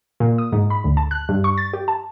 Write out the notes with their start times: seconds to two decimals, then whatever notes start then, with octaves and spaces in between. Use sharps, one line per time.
0.20 A#2
0.38 D#6
0.52 G#2
0.70 B5
0.84 D2
0.97 A5
1.11 F#6
1.29 G2
1.44 C#6
1.58 A6
1.73 G4
1.88 A5